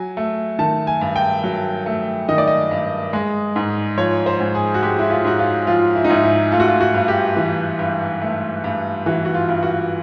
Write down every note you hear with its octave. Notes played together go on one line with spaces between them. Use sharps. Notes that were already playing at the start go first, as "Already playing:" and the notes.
Already playing: F#3 G#5
A3
D#3 A5
G#5
G2
G5
F#3
A3
D#3 D#5
D5
D#5
G2
G#3
G#2
F3 C#5
C5
G#2
G#4
F#4
G#3 G4
E4
F4
G#2 F#4
F4
F3 F4
E4
D#4
G#2 E4
E4
A3 F4
F#4
F4
F#4
G2
G4
E3
G2
A3
G2
E3 F#4
F#4
F4
G2
F#4